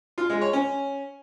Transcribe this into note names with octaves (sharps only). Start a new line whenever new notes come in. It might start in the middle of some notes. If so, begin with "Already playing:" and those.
F4
G#3
C#5
C#4